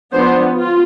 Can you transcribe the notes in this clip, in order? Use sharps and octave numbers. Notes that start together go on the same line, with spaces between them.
F3 B3 D4 C5
F4